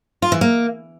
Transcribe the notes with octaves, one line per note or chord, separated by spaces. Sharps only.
F4
E3
A#3